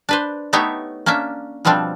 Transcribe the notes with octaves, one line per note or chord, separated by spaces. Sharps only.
D4 B4 C5
A3 B3 D#4 G4 C#5 E5
A#3 C#4 D4 E5
B2 F3 G3 C4 D4